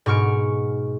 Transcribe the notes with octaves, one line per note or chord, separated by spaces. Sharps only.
G#2 B2 C#6 F6 D7